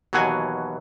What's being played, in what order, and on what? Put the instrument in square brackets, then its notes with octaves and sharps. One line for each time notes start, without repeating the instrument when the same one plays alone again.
[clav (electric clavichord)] D#2 B2 E3 F#3 F#5 G#5